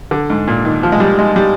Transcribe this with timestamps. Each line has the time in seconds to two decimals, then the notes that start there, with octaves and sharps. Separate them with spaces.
0.11 D3
0.30 G#2
0.48 A#2
0.65 D#3
0.83 F3
0.92 G#3
1.00 G3
1.19 G#3
1.36 G3